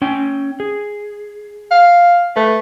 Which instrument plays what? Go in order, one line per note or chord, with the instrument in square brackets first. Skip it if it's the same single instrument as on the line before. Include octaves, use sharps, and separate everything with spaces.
[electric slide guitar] C#4 G5
G#4
[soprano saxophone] F5
[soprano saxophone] A3 [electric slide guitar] B4